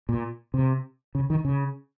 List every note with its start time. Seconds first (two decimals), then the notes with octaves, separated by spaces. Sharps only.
0.09 A#2
0.54 C3
1.15 C#3
1.30 D#3
1.45 C#3